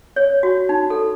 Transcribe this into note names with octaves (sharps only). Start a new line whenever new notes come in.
C#5
F#4
D#4
A4